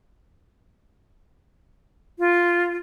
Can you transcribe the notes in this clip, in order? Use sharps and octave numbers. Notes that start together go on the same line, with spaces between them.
F4